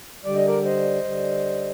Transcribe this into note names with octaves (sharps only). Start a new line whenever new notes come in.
D3 G3 D5
D#5
A#4 D5
C5 D#5
D3 G3